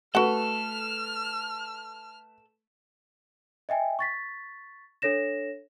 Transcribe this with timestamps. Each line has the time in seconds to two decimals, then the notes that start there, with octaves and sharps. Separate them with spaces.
0.15 A3 F#4 A4 B4 F#5 F6
3.69 D#5 E5 G5 G#5
3.99 C#6 A6 B6
5.02 D4 A4 C#5 A#6 E7